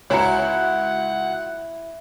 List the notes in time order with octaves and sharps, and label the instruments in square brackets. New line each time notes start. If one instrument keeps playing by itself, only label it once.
[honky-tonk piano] C#2 F#4 C#7 [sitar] E4 [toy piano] C#5 G#5 A#5 [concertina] F#5